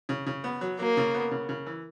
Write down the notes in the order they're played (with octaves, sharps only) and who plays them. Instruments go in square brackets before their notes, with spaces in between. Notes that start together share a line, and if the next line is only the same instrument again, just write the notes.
[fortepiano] C#3
C#3
B3
F#3
[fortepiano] F#3 [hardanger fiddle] A#3
[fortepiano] C#3
B3
C#3
C#3
E3